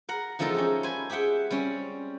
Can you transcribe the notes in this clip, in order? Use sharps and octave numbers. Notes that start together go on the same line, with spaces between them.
A#4 F#5 A#5
E2 F3 G#3 D#4 A4 A#4
C#4 D#4 G4
C5 G#5 B5
G4 G#4 E5 F#5 G5
G3 C4 C#4